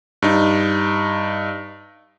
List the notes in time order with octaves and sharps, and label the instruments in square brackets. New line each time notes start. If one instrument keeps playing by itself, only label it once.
[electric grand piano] G2 D#4